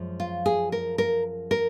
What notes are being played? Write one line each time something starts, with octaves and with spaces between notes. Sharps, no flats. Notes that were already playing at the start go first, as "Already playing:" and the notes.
Already playing: F#2 F3 G#3
F4
G#4
A#4
A#4
A#4